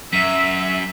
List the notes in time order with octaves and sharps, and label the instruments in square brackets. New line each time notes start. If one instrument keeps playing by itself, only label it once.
[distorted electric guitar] F#2 [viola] E5 [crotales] B6